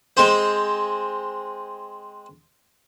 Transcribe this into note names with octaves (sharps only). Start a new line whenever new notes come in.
G#3 C4 C5